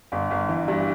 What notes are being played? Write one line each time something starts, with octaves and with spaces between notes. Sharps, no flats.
G1
G1
E3
G2